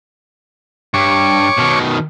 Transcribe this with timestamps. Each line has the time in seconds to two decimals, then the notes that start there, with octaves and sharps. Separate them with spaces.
0.94 G2 C#5 C#6 D6
1.57 B2 D#3